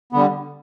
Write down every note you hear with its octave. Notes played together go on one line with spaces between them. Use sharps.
D3 G3 B3